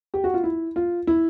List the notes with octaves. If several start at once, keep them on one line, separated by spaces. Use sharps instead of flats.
G4
F#4
F4
E4
F4
E4